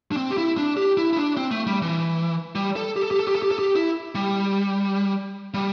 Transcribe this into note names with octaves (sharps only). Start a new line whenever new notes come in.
D4
C4
G4
E4
D4
G4
E4
E4
D4
C4
A3
G3
E3
G3
A4
G4
A4
G4
A4
G4
A4
G4
A4
G4
E4
G3
G3